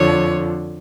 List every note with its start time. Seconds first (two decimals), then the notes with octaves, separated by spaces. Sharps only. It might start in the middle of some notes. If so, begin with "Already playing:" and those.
Already playing: F2 D3 F3 C#5